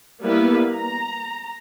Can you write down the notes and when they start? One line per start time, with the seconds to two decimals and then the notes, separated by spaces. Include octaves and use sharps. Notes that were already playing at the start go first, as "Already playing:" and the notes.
0.22 G3 A#3 B3 E4 B4
0.74 A#5